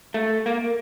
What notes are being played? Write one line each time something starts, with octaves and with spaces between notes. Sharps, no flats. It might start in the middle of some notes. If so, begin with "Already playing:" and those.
A3
A#3